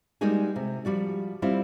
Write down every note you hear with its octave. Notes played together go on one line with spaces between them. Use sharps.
G3 G#3 A#3 D#4 F#4 G#4
C3
F3 G3 F#4 D5
G3 C4 E4 F4